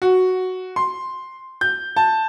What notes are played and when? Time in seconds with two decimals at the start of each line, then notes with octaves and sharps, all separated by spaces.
0.02 F#4
0.76 C6
1.61 G6
1.96 A5